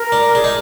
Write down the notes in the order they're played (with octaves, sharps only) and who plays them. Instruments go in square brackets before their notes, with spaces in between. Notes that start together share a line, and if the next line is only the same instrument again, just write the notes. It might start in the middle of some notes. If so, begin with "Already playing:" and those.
Already playing: [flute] A#4
[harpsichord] D4
[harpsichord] D4 [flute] G#4
[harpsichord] D#4